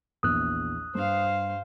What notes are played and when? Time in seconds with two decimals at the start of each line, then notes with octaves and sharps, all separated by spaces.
0.23 A#1 E2 D#6 E6 F#6
0.95 G2 C5 F5